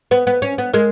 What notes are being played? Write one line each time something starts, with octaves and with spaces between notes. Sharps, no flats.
B3 B4
B3
C#4
B3
G#3 A#4